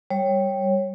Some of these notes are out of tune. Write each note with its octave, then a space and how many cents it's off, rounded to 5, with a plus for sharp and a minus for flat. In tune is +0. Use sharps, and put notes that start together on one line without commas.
G3 +0 C#5 -15